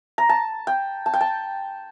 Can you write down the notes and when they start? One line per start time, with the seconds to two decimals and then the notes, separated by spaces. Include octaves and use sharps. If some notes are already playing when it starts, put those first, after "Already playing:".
0.18 A#5
0.29 A5
0.67 G5
1.06 A5
1.13 G5
1.21 A5